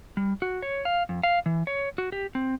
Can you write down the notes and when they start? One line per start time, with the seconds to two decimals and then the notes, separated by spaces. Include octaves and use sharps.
0.17 G3
0.42 F#4
0.62 C#5
0.85 F5
1.09 F2
1.23 F5
1.46 E3
1.67 C#5
1.98 F#4
2.12 G4
2.35 C4